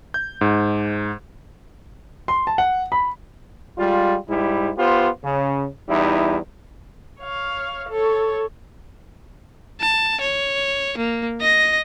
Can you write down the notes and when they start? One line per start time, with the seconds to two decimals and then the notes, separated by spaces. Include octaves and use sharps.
0.14 G6
0.41 G#2
2.28 C6
2.47 A5
2.58 F#5
2.92 B5
3.78 G3 G#3 F4
4.29 G#2 G3 E4
4.77 B3 F4 G4 C5
5.24 C#3
5.88 E2 G3 D#4 E4
7.19 C#5 F5
7.89 A4 C#5
9.81 A5
10.21 C#5
10.98 A#3
11.41 D#5 A#6